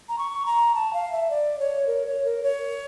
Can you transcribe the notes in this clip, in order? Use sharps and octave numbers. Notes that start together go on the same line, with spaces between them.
A#5
C#6
A#5
A5
F5
E5
D5
C#5
A#4
C#5
A#4
C#5